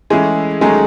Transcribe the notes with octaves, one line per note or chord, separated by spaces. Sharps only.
E3 G#3 A3 C#4 E4 G#4
D#3 F#3 G#3 A3 C#4 G#4